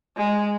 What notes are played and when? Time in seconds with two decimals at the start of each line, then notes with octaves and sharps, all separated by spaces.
0.17 G#3